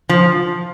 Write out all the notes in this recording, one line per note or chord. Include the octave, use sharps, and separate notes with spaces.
F3